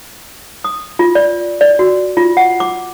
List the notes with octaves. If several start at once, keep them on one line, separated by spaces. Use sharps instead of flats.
D#6
F4
D5
D5
F#4
F4
F#5
D6